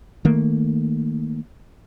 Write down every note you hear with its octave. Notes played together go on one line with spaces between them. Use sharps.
D#3 A3 A#3